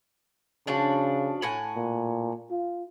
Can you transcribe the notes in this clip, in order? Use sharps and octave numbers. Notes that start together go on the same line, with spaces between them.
C#3 F3 D4 F#4
A2 F#5 G#5
A#2
F4